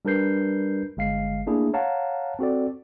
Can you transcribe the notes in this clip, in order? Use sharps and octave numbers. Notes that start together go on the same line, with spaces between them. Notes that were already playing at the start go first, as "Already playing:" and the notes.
G3 D4 A#4 B4 G6 C7
G1 G#3 F5 C7
A3 A#3 D4 E4 G#4
C#5 F5 F#5 A5 A#5
C4 F#4 A4 D5